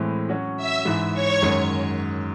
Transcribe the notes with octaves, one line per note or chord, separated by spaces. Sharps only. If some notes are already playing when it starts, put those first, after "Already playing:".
Already playing: A2 E3 G#3 C4
F#3 C#4 F#4
E5 E6
G#2 E3 G#3
C#5 C#6
F#2 D#3 G#3